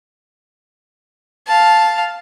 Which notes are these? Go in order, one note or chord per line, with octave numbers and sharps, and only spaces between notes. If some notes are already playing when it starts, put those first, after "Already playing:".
F5 A5